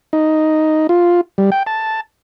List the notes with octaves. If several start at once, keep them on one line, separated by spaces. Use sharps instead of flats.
D#4
F4
G3
G5
A5